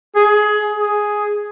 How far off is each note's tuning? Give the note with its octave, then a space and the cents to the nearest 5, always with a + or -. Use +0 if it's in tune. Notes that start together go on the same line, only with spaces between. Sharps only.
G#4 +20
G#4 +5